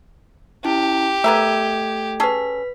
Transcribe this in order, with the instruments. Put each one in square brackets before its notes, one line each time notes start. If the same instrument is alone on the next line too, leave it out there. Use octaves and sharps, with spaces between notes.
[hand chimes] C#4 E4 A5 [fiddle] G4
[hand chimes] A3 A4 G#6 [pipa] B3 A#4 E5
[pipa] C#4 G#4 A4 [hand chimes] B4 B6